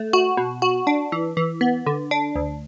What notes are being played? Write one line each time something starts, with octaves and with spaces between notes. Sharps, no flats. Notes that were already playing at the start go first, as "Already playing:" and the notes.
Already playing: A3
F#4
B2
F#4
D4
E3
E3
B3
D3
D4
D2